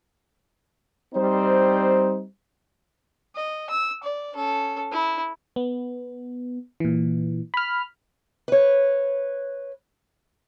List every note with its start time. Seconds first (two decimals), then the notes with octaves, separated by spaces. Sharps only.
1.15 G3 C4 D#4 C5
3.36 D#5
3.70 E6
4.03 D5
4.34 C#4 A4
4.92 E4
5.56 B3
6.80 A#2 E3
7.54 B5 F6
8.48 B4 C#5